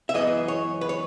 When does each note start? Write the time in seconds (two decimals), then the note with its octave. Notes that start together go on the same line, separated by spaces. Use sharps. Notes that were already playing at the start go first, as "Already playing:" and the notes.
0.09 E5
0.14 F#2 E3 G#3 B3 D#5
0.48 C#5
0.81 B4
0.89 C#5